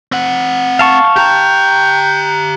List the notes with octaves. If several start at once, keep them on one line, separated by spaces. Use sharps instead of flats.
C4 F#5
F5 A5 C#6
G4 G5 A#5